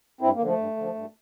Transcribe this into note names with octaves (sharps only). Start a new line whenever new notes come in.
G2 C4 E4
A#3
D3
F3 A3
G2
D3 F3
G2